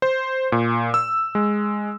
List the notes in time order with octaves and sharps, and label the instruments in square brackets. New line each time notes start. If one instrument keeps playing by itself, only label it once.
[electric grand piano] C5
A#2
E6
G#3